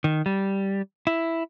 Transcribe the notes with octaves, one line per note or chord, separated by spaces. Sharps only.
D#3
G3
E4